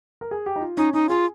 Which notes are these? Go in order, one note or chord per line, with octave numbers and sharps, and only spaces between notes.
A#4
G#4
G4
D#4
F4
C#4 D#4
C#4 D#4
F4 G#4